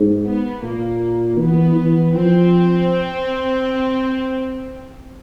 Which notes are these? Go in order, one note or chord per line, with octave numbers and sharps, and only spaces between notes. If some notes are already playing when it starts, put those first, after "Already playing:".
Already playing: G#2
B3
A#2 A#3
E3 B3
E3
F3 C4